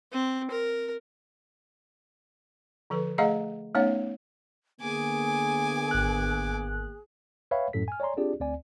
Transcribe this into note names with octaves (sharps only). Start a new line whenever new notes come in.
C4
A#4
D3 F3 A4 B4
A3 G#4 D#5 F5 F#5 A#5
A3 B3 C#4 D#4 C#5 F#5
D3 A#3 B3 G#4 G#5 D6
G#1 F#6
B4 C#5 E5 F5 G5 B5
F#2 A2 A4 B6
G#5 F6
C#5 D5 G#5 A#5 C6
C4 D4 F4 G4 G#4 D5
D2 C4 D5 G#5